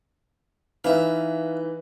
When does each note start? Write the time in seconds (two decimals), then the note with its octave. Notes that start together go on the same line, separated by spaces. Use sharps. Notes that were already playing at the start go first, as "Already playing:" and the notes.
0.84 E3 D#4 B4 E5 F5